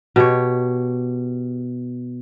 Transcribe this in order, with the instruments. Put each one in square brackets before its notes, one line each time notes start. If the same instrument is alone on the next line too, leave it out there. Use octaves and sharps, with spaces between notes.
[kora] B2 G4 C#5